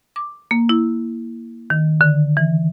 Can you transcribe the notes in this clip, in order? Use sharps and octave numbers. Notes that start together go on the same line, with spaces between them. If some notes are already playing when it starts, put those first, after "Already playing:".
D6
A#3
E4
D#3
D3
E3